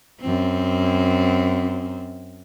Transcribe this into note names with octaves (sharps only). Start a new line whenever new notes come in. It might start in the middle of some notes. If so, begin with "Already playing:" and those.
F#2 C4